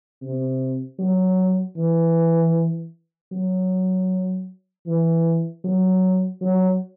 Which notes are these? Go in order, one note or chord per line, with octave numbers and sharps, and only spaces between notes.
C3
F#3
E3
F#3
E3
F#3
F#3